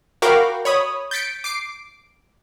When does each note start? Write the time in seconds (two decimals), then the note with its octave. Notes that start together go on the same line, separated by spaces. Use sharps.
0.22 F#4 A#4 F5 G5 B5 D6
0.65 C#5 B5 D#6
1.11 G6 A6 B6 C#7 D7
1.44 D6 C7 D7